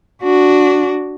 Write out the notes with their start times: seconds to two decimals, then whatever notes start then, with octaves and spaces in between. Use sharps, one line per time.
0.23 D4 F#4